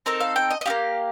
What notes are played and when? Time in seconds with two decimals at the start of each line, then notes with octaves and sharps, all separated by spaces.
0.06 C4 D#4 A4 A#4
0.20 F5
0.36 G5
0.51 D#5
0.61 D#5
0.66 D#4 G4 F5
0.70 A#3